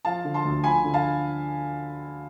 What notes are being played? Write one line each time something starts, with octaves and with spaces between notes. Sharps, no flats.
F3 F5 A5
D3
A5 C6
D2
F3 G#5 B5
D3
F5 A5